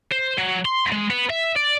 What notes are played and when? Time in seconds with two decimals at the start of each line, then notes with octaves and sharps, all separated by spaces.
0.11 C5
0.38 F#3
0.65 C6
0.92 G#3
1.10 B3
1.30 E5
1.56 D5